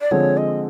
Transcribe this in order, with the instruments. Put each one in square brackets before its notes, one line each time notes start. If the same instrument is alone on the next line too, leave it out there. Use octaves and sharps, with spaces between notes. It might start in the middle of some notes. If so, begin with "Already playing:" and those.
[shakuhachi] D5
[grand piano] D3 F3 G#3 C4 [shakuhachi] C#5
[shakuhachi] D#5